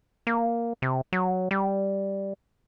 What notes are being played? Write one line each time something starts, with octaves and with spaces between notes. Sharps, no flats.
A#3
C3
F#3
G3